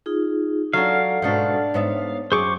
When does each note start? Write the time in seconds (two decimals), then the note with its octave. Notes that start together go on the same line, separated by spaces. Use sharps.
0.06 D#4 F4 G#4
0.73 F#3 D4 A4 F5 F#5
1.22 G#2 B2 A3 D4
1.74 G#2 B3 C#5 E5
2.32 F#2 G#4 C5 C#6 D6